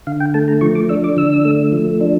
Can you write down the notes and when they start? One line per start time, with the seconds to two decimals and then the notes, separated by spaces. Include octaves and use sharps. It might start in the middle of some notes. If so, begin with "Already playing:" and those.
0.07 D3 F5
0.20 G5
0.34 A3 A5
0.48 A#5
0.61 F3 C#6
0.75 D6
0.89 D4 E6
1.04 D6
1.17 D3 E6
1.45 A3
1.72 F3
2.01 D4